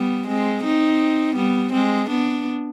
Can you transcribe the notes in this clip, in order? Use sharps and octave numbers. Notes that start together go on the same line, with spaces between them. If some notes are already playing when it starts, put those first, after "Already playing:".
Already playing: G3 B3
G#3 C4
C4 D#4
G3 B3
G#3 C4
B3 D4